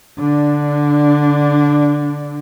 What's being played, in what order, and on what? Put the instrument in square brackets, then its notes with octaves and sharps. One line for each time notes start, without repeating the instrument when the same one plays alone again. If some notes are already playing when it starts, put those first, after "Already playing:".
[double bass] D3 D4